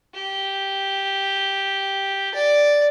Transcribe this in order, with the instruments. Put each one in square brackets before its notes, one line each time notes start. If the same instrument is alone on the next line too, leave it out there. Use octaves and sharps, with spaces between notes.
[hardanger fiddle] G4
D5